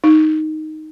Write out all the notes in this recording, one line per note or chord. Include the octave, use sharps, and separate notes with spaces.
D#4